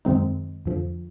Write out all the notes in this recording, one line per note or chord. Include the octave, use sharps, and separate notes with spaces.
F#2 D#3 G#3 C4 D#4
F2 D3 F3